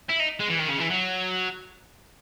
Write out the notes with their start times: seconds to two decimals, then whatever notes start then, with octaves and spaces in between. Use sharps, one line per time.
0.09 E4
0.19 D#4
0.40 G#3
0.50 E3
0.60 D#3
0.70 C#3
0.80 E3
0.91 F#3